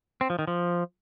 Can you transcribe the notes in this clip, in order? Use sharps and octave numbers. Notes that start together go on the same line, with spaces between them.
C4
F3
D#3
F3